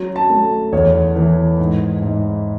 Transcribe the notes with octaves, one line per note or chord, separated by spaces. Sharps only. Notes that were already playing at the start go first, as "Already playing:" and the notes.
Already playing: F#3 C#4
A5
A3
E2 C#5
E3
G#2
G#2